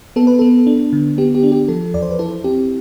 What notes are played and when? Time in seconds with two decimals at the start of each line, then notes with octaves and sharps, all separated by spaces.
0.16 B3 A4
0.27 B4
0.39 B3 A4
0.67 D4
0.93 D3
1.18 B3 G4
1.35 G4
1.43 D4
1.52 G4
1.68 F3 A4
1.94 E2 D5
2.02 C5
2.11 B4
2.19 E4 A4
2.44 C4 G4